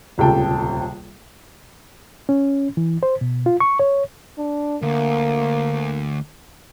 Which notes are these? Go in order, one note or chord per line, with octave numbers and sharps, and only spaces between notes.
D#1 C#2 C3 A4 G5 A5
C#4
E3
C5
B2
F4
C#6
C#5
D4
D2 A#3